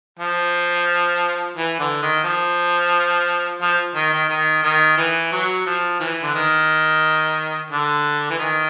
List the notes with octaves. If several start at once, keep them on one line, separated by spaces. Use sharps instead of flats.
F3
E3
D3
D#3
F3
F3
D#3
D#3
D#3
D#3
E3
F#3
F3
E3
D3
D#3
D3
E3
D#3